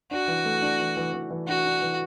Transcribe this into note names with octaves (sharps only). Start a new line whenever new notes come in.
D4 F#4
E3
A3
D4
E3
E3
E3
E3
D4 F#4
D4
E3